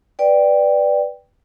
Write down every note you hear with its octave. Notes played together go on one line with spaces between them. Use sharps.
B4 D5 G5